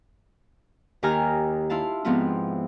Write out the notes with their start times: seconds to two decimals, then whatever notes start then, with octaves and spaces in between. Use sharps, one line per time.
1.03 D#2 D#3 G4 G#5 A#5 F6
1.70 E4 F4 F5 A5
2.05 G#2 F3 B3 C4 E4 F4